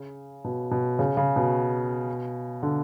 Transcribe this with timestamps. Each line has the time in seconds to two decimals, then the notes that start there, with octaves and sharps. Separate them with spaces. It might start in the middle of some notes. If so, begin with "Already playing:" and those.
Already playing: C#3
0.44 B2
0.71 B2
0.99 C#3
1.17 C#3
1.36 B2
2.63 D3